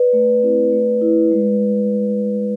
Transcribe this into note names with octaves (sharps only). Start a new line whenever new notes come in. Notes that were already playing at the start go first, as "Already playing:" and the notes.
Already playing: B4 D5
A3
C4 E4
A3
E4
G#3